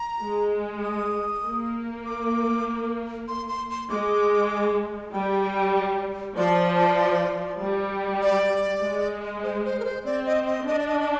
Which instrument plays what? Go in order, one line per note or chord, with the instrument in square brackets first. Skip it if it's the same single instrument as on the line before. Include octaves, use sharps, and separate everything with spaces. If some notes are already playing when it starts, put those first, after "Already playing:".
Already playing: [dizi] A#5
[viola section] G#3
[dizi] D#6
[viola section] A#3
[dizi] D6
C6
C6
C6
[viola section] G#3 [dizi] D6
[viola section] G3 [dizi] G5
[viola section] F3 [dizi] D5
[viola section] G3
[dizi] D5
[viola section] G#3
[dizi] C5
C5
A#4
C5
[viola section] C4 [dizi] D5
[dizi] D#5
D#5
[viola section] D4 [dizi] D#5
[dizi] D5
D#5
D#5